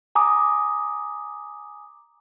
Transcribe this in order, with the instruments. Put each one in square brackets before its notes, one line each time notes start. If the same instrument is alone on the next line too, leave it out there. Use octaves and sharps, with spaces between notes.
[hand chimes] G#5 A#5 D6 D#6